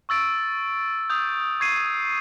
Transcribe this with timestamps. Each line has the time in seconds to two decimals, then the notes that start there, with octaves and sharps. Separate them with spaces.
0.09 C#6 E6 A6 D7
1.10 D#6 G6
1.60 C#6 G#6 C7 D#7